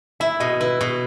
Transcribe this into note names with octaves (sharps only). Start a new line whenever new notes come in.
E4 E5
B2 D#5
E4 B4
B2